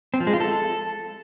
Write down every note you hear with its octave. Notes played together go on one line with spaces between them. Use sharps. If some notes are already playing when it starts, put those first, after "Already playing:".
C4
F3
G#3
F4
A4